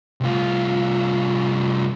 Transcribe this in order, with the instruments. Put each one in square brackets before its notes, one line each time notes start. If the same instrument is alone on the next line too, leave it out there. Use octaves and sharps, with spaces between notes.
[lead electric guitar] C2 F4